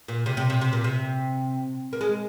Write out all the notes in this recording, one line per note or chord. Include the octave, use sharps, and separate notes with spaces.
A#2
C3
C3
C3
C3
A#2
C3
A#3
G#3